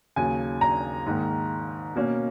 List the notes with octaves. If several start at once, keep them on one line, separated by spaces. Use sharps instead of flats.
D#2 C#3 F#3 G#5
A#5
G#2 D#3 A#3
B2 A#3 C#4